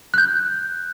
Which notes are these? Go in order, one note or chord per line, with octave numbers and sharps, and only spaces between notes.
F#6 G6